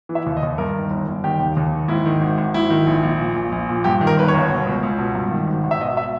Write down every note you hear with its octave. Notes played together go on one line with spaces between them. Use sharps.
E3
E5
D#2
D#5
D#2
G2 A#4
D#3
G1
G1
D#3 G4
D#2
D#2
D#3
G#2 E4
D#3
G#1
G#1
G#2 E4
D#3
A#1
A#1
A#2
A#1
A#1
A#2
G2 G4
D#3
A#4
G1 B4
C#5
G1
B2
C#2
C#2
B2
G2
D#3
G#1
G#1
E5
B2 D#5
E5